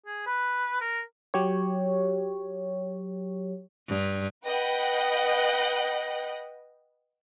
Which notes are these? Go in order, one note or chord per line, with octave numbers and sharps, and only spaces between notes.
G#4
B4
A#4
F#3 G4 C#5
G2
B4 D#5 F#5 G5